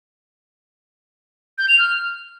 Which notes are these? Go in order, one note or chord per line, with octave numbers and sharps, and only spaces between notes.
G6
F7
F6